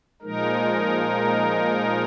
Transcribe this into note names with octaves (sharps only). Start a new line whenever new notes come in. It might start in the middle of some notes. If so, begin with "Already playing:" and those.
A#2 F3 G#3 D#4 A#4